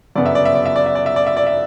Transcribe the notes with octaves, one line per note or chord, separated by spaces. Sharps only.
G1 F#2 C#3 F#3 B3 D5
E5
D5
E5
D5
E5
D5
E5
D5
E5
D5
E5
D5
E5